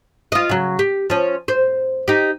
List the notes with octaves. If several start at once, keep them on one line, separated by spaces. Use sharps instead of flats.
F4 D#5
C#3 F#3
G4
F3 C#4
C5
D#4 G4